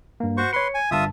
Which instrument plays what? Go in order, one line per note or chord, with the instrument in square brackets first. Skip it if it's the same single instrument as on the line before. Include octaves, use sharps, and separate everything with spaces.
[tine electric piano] G2 A#3
[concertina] F#4 C5 C#6
[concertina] B4 C6 [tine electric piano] C#5 C#7
[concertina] G#5
[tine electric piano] G1 G2 A5 [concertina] F4 E5 D#6